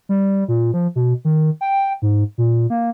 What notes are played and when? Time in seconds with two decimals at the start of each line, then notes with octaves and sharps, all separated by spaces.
0.09 G3
0.48 A#2
0.74 F3
0.96 B2
1.25 D#3
1.61 G5
2.02 G#2
2.38 A#2
2.70 A#3